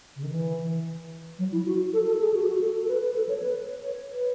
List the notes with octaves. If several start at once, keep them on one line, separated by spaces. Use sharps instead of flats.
C#3
D#3
E3
F#3
E4
F#4
A4
A4
G#4
F#4
F#4
A4
A4
B4
B4
A4
C#5
B4
C#5
B4